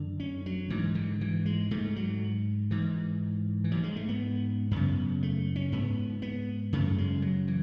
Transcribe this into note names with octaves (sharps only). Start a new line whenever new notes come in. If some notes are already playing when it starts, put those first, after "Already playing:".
Already playing: F#2 D3
C#4
F#3
G#2 E3
D3
E3
G#3
G#2 A3
F#3
G#2 E3
E3
G#2 F#3
G#3
A3
B3
F#2 C#3 B3
A3
C#4
G#2 B3
B3
F#2 C#3 A3
G#3
F#3
E3